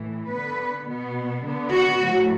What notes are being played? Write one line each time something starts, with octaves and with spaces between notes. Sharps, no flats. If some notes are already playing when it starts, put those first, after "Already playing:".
Already playing: A2 E3
D3 B3 B4
B2 B3
D3 B3
F#4
A2 F#3 A3